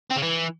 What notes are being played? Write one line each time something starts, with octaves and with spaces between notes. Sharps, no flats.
C4
C#3
E3